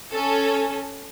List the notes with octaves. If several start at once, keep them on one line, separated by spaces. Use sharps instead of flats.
C#4 A4